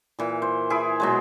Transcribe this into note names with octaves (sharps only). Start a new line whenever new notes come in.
A#2 E3
C5
E4 G#4
B2 F#3 G#3